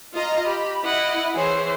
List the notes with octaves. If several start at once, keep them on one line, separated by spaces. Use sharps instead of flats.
F4 D#5 A#5
G4 B5
E4 D#5 F#5
E3 G#4 C5 C#5